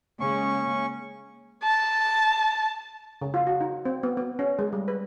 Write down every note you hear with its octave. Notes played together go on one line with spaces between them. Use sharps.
C#3 G#3 A#3 C#4 C#6
A5
C#3
F4
F#4
D#4
C4
B3
B3
C#4
G#3
G3
B4